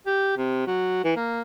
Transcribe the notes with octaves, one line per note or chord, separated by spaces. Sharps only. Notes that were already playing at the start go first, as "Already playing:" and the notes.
G4
C3
F#3
E3
A#3